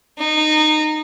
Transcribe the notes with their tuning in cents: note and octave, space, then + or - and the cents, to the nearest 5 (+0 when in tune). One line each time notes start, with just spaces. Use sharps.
D#4 -20